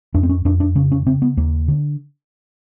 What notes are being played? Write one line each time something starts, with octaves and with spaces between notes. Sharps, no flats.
F2 D4
C4
C#4
F2 D4
D4
C#3 C#4
C#4
C#3 C4
B3
D#2 A#3
D3